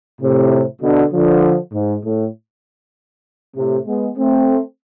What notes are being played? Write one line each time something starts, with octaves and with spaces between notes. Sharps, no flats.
A2 C3
B2 D3
D3 F3
G#2
A2
A2 C3
G#3 B3
A3 C4